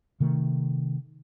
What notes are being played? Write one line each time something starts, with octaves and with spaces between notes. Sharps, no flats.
C3 D#3 A3